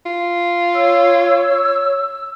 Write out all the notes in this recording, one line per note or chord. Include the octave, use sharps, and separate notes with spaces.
F4
C#5 E6